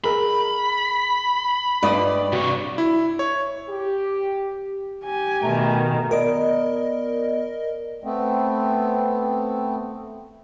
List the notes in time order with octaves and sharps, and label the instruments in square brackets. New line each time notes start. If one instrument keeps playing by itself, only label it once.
[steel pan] G#4 A#4 [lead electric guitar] B5
[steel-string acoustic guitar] G2 D5 [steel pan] D#4 F4 D#6
[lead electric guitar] C3 C#5 [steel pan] F#4
[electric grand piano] E4
C#5
[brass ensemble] G4
[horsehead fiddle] G4 G#5
[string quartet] B2 D#3 [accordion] A3 A#5
[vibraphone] B3 D5 [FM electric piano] A#4 D#5
[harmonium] A3 B3 C4